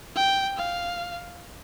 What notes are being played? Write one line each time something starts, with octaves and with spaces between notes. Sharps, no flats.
G5
F5